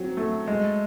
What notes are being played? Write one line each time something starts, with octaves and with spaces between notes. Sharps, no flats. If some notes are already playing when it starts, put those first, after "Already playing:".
Already playing: F#3 C4
A3
G#3